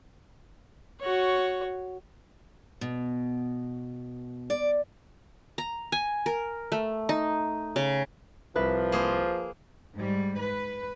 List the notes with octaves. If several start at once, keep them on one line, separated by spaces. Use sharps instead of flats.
F#4 C#5
B2
D5
A#5
G#5
A#4
A3
D#4
C#3
C2 F3 B4
A#3 G#4 C5
G#2 G3
B4